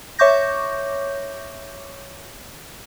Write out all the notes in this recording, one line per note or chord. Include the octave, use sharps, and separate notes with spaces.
C#5 E5 C#6 D6 G6 A#6